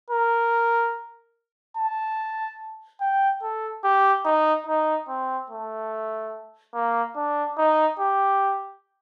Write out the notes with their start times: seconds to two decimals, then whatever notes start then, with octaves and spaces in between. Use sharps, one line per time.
0.11 A#4
1.77 A5
3.01 G5
3.43 A4
3.84 G4
4.25 D#4
4.67 D#4
5.09 C4
5.50 A3
6.74 A#3
7.16 D4
7.58 D#4
8.00 G4